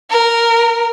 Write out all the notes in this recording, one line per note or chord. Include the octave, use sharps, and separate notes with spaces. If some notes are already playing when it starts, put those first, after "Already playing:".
A#4